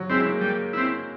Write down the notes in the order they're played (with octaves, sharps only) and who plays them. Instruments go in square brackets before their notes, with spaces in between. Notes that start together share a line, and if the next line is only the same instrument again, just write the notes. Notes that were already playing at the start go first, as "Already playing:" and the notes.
Already playing: [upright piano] F#3
[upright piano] G#3 [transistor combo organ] C4 E4
[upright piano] A#3
[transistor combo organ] G3
C4 E4